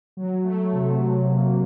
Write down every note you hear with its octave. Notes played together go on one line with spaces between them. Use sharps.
F#3
A3
C3
F#3
A#3